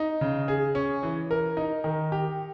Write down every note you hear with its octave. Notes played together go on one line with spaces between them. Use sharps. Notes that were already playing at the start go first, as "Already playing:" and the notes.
Already playing: D#4
C#3
G#4
C#4
E3
A#4
D#4
D#3
G4